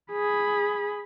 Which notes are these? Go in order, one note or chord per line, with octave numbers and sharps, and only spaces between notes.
G#4 B5